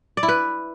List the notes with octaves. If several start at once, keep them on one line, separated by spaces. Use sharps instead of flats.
D5
E4
B4